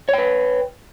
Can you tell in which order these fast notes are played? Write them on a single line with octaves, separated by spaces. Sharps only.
C#5 G5 B4